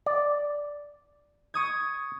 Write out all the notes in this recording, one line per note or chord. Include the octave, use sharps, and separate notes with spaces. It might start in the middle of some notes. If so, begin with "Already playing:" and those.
D5
C#6 D#6 G#6